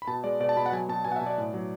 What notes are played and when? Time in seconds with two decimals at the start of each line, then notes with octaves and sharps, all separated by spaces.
0.02 B5
0.07 B2 A5
0.24 G#3 D5
0.40 B2 D5
0.49 A5
0.56 B2 B5
0.66 F#5
0.72 F#3 G#5
0.89 B2 A5
1.05 B2 G#5
1.12 F#5
1.16 E5
1.21 B2
1.26 D5
1.38 A2
1.54 F#3